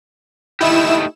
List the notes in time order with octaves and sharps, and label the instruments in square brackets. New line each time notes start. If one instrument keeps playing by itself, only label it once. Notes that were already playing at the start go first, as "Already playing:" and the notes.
[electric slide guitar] A3 D#4 G4 [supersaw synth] E4 E7